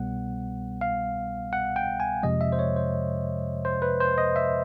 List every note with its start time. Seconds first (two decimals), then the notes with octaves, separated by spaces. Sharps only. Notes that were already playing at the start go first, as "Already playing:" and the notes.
Already playing: C2 B2 G3 B3 F#5
0.81 F5
1.53 F#5
1.76 G5
2.00 G#5
2.23 F2 C3 F3 G#3 D#5
2.41 E5
2.52 C5
2.59 C#5
2.76 C5
3.65 C5
3.82 B4
4.00 C5
4.18 D#5
4.36 E5